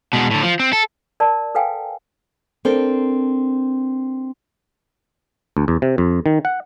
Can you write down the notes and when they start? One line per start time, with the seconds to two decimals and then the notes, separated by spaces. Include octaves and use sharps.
0.13 B2 G#3
0.31 A2 D3
0.43 F3
0.60 C4
0.73 A4
1.20 A#4 D5 A5
1.55 A4 B4 F5 G5 G#5
2.65 C4 D4 A4 A#4 C5
5.57 D2
5.68 E2
5.82 C3
5.98 F2
6.26 D#3
6.45 F#5